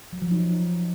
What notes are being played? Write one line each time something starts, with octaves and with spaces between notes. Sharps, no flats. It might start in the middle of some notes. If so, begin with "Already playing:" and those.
F#3
F3
D#4